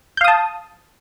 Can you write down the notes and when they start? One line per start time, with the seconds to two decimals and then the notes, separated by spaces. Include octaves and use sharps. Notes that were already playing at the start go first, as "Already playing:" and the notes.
0.17 G6
0.21 F5
0.24 D#6
0.28 A5